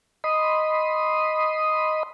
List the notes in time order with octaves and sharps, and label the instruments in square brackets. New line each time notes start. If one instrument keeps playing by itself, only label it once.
[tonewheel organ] D#5 B5 C6 D#6